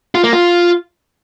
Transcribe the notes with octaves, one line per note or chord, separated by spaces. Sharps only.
F4
A#3
F4